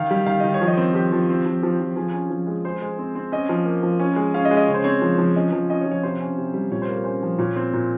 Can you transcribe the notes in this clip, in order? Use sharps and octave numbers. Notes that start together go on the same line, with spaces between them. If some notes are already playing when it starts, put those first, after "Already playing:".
Already playing: D#3 F5
G3
D#3 F5
D#3 D#5
C#5
F3
D#5
C4
F3 G4
F3
C4
F3
F3 G4
F3
F3 G#4
C#4
F3
G#3
G#3 C5
G#3
C4
C4
C#4 D#5
F3
A#3
F3
C#4
G#3
C#4 F5
D#5
G#3
D#5
C#3 C#5
C5
C4 C#5
F3
F3
C#4 D#5
F3
C#4 D#5
C#5
F3
C#5
C3 C5
C#4
C3
G3
A#2 C#5
C5
A#3
A#4
C#4 C5
F3
A#2 C#5
C4
A#2